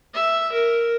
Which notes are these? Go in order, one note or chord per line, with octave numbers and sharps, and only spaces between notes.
E5
A#4